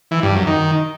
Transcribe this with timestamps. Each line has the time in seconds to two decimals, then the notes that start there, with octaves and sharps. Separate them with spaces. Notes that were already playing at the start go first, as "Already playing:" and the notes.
0.11 E3
0.23 G2
0.35 F#2
0.47 D#3